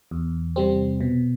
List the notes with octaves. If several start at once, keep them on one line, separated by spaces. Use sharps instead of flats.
E2
C3 G3 C4
B2